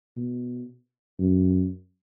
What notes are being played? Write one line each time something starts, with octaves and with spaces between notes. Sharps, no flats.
B2
F#2